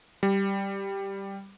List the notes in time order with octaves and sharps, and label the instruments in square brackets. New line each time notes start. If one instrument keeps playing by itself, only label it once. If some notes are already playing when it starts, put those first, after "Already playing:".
[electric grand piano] G3